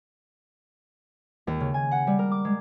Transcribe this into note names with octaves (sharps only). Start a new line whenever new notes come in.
D#2
C#3
G#5
F#5
G3
A#4
D6
G#3